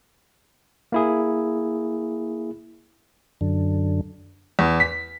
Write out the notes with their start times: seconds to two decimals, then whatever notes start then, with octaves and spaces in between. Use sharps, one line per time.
0.92 A#3 E4 G#4
3.41 F#2 D3
4.59 E2
4.80 B6